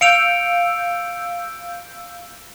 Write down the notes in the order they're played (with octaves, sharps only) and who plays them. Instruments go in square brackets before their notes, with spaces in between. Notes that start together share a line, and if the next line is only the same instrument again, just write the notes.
[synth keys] F5 E6 G6 [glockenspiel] C#7 D7 F7